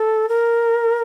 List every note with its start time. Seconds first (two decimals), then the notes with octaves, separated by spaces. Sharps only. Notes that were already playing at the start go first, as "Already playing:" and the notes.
Already playing: A4
0.29 A#4